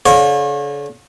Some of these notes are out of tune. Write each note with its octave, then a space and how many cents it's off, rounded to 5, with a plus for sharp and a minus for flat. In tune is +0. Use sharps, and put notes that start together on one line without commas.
D3 -45 C#5 -35